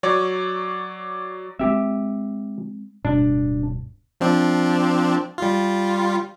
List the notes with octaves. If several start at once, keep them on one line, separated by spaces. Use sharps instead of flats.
F#3 C#5 D5
G#3 B3 C4 G4 E5
D1 G2 B2 D4
F3 C4 D4
G3 F4